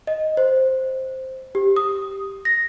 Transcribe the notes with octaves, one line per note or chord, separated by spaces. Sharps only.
D#5
C5
G4
D#6
A#6